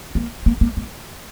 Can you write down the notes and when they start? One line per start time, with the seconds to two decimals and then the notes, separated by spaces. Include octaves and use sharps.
0.15 A#3
0.46 A#3
0.61 A#3
0.77 A#3